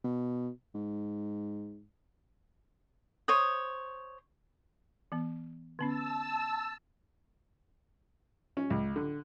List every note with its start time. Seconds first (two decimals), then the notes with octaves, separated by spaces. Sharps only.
0.04 B2
0.75 G#2
3.28 C5 C#5 D#6
5.12 E3 B3
5.79 D3 B3 C#4 A5 E6
8.57 C#4
8.70 C#2
8.96 D3